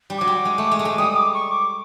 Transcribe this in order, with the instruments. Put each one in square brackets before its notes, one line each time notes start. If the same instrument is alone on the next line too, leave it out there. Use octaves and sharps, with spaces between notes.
[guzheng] G3
[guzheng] F#3 [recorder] D6
[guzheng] G3
G#3
A3
G#3
A3
G#3
[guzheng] G3 [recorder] D#6
[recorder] D6
C#6
D6